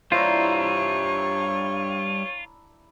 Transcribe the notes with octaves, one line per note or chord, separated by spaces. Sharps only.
G2 D4 E4 F4 C5 C#5 A#5